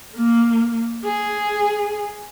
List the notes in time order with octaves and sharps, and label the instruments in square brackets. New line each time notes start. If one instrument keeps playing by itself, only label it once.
[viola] A#3
G#4